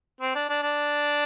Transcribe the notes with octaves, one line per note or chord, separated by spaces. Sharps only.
C4
D4
D4
D4